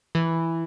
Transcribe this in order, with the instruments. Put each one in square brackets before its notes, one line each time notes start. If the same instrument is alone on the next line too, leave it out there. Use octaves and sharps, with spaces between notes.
[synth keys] E3